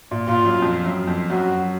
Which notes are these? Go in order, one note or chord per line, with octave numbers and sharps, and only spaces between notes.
A#2
A#2 F4
F#2
F2
F#2
F2
F#2 F#4